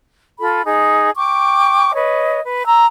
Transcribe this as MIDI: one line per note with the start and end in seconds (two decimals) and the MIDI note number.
0.40 0.62 65
0.40 0.62 69
0.40 0.62 83
0.65 1.11 63
0.65 1.11 68
1.16 1.93 79
1.16 1.93 85
1.16 1.93 86
1.95 2.40 71
1.95 2.40 73
1.95 2.40 75
2.43 2.65 71
2.66 2.85 82
2.66 2.85 88